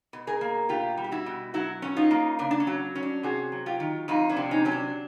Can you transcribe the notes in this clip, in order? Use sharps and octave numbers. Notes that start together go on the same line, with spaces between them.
B2
G#4 A#4
A#3
B2 F4 G4
G3
G4
E4 F#4
B2
F#3 E4 F#4
C#4
D#4 F4
A#3
C#3 D4
D4
C#4
F#3
C#4
D4
C3 F#4 G#4
F#3
F4 G4
D#3
F2 D#4 F4
D4 E4
C3
C#4 D#4
F#3 C#4
D4